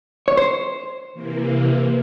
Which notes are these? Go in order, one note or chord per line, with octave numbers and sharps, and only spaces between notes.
C#5
C5
C3 E3 A#3